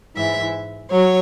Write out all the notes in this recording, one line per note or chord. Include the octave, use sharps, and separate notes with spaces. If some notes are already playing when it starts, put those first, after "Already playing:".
G#2 E3 E5
F#3 C#5